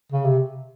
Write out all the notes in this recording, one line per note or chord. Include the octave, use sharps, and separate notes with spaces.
C#3
C3